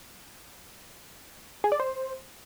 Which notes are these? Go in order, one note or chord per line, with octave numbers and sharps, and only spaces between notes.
G#4
D5
C5